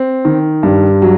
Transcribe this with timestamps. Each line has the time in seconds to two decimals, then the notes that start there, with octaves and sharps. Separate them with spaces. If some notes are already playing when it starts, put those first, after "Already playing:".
Already playing: C4
0.25 D#3
0.63 G2
1.02 F#3